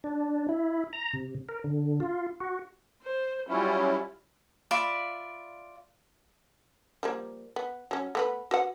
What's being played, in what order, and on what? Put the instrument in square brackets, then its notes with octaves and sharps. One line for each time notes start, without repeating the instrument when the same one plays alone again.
[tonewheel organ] D4
E4
A#5
C3
A#4
D3
F4
F#4
[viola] C5
[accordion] F#3 C#4 E4 [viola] G3 F4
[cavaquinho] F4 D5 E5 B5
[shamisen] F3 G3 A#3
B3
F#3 C#4
A3 B3 B4
F#4 B4 F#5